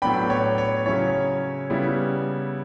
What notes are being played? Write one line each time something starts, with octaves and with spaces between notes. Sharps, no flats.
A2 F#3 B3 D4 G5 B5
C#5
C#5
C#3 F#3 C#4 E4 C#5
C#3 G3 B3 E4